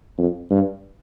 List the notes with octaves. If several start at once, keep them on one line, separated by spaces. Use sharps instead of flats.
F2
G2